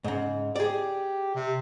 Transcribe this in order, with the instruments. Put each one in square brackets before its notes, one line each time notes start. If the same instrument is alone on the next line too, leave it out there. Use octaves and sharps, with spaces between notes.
[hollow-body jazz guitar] G#2 C#3
[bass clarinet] G4 [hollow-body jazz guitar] G#4 D5
[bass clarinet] C3